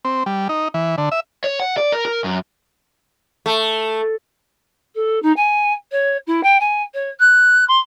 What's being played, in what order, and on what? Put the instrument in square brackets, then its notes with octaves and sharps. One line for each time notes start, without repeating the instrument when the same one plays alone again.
[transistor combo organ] C4
G3
D#4
E3
D3
E5
[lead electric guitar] C#5
F#5
D5
A#4
A#4
F#2
[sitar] A3
[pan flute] A4
D#4
G#5
C#5
E4
G5
G#5
C#5
F#6
C6